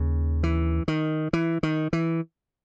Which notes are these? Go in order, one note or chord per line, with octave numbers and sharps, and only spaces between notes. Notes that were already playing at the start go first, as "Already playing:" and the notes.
Already playing: D#2 C#3
E3
D#3
E3
D#3
E3